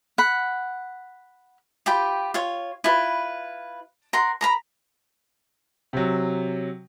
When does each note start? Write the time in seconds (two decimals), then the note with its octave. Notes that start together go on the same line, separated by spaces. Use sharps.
0.18 F#5 B5
1.86 F4 G4 G5 B5
2.34 F4 C#5
2.84 E4 F4 B4
4.13 A#4 F#5 C6
4.41 A#4 A#5 B5
5.93 C3 F#3